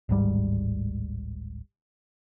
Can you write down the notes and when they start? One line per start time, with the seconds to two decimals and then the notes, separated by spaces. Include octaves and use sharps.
0.09 D1 G#1 G#2 G3